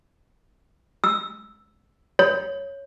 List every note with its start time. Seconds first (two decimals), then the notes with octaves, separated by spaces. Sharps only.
1.04 E6
2.19 C#5